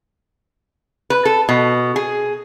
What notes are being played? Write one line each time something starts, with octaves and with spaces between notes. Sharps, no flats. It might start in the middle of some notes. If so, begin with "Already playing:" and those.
B4
A4
B2
G#4